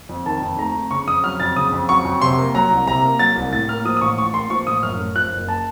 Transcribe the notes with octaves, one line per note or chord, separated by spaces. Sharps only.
F2
D#3 A5
F2
A3 A#5
F2
C#3 C#6
F2 D#6
F#3 F6
F2 A6
C#3 D#6
F2
F#3 C#6
F2
C3 C6
A#3
F#3 A#5
C2
C3 A#5
A#3
F#3 A6
C2
A2 A6
A#3 F6
F3 D#6
D#6
A1 C#6
A2 C#6
A#3 C6
F3 C#6
A1 D#6
F#2 F6
A3
F3 F#6
F#1
A5